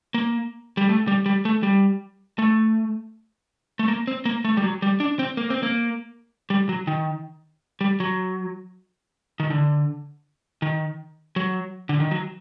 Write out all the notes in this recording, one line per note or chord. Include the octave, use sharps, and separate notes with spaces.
A#3
G3
A3
G3
G3
A3
G3
A3
A3
A#3
C4
A#3
A3
G3
F#3
G3
D4
C4
A#3
C4
A#3
G3
F#3
D#3
G3
F#3
D#3
D3
D#3
F#3
D3
D#3
F#3